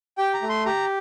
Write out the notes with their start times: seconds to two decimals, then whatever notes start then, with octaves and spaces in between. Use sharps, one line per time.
0.18 G4 G5
0.34 A#5
0.42 A3
0.49 C6
0.65 G4 A#5